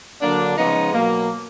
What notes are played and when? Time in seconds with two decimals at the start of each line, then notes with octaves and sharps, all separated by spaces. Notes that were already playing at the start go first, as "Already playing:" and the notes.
0.22 D3 F#3 A#3 D4
0.57 C#3 F3 G#3 B3 D#4
0.93 B2 F#3 A#3